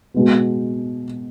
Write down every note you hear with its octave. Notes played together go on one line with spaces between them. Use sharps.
B2 G#3 B3